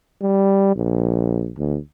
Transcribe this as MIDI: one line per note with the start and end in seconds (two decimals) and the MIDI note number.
0.22 0.74 55
0.76 1.52 34
1.58 1.78 38